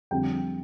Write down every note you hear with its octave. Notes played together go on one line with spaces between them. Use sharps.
F2 D3 G3 G5